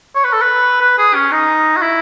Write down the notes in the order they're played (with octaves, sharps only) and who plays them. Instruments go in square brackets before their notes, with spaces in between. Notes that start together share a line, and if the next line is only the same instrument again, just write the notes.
[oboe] C#5
B4
A4
B4
B4
G#4
C#4
D#4
F#4
E4